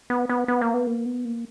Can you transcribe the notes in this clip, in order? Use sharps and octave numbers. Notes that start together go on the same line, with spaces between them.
B3
B3
B3
A#3
B3
A#3
B3
A#3